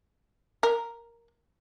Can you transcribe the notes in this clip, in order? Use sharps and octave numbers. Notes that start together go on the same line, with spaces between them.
A#4